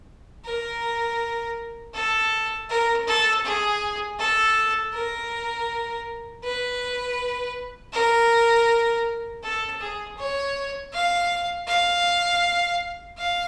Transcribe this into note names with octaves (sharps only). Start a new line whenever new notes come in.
A#4
A4
A#4
A4
G#4
A4
A#4
B4
A#4
A4
G#4
C#5
F5
F5
F5